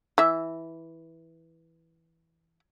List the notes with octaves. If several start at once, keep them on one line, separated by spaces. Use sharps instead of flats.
E3 E5